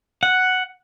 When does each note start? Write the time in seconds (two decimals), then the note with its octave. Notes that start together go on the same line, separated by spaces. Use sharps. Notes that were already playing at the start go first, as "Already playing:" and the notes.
0.23 F#5